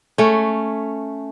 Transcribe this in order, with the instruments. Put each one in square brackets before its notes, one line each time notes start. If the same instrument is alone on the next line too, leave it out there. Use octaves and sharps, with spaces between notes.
[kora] A3 C#4